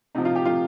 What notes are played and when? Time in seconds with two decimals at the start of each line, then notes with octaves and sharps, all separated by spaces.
0.15 C3 F3 D#4
0.25 F4
0.35 G4
0.45 C3 F3 F4